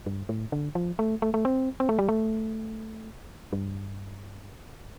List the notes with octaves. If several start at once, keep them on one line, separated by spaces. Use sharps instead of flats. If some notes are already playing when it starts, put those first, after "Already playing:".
G2
A2
D3
F3
A3
A3
A3
C4
C4
A3
G3
A3
G2